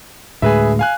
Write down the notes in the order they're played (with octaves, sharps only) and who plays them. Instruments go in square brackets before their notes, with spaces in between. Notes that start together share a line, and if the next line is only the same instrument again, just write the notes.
[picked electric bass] D2 A2 G#3 [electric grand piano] G#4 B4 E5
[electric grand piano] F5 G#5 F#6